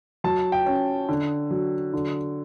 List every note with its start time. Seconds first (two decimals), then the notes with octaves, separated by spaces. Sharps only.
0.24 F#3 A5
0.52 G5
0.66 C#4
1.09 D3
1.51 F#3
1.94 D3